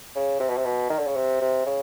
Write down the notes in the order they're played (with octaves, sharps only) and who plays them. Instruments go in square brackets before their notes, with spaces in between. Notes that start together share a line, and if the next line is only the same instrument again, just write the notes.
[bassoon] C#3
C3
B2
C3
B2
D#3
D3
C#3
C3
C3
C#3